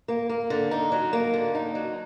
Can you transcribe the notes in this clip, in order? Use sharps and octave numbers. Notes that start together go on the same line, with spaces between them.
A#3
A#3
D3
D#4
F#3
A#3
D3
D#4
F#3